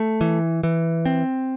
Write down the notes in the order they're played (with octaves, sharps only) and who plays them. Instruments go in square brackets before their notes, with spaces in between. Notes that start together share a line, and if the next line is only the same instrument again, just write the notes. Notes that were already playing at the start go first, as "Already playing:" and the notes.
Already playing: [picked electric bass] A3
E3
E3
C4